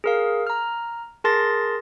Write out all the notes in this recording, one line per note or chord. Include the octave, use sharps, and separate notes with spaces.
G#4 A#4 F5
A#5 F6
G#4 A#4 A5 C6 A6 A#6